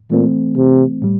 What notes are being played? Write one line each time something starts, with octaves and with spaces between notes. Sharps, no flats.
A#2 E3 A3 C4
C3
A2 G3